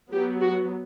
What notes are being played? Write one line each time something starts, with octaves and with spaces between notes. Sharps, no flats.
F#3 B3 G4
F#4